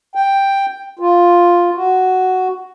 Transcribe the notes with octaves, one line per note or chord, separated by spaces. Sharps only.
G5
F4
F#4